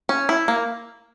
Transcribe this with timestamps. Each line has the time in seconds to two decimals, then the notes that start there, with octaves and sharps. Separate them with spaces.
0.09 C#4
0.29 E4
0.48 A#3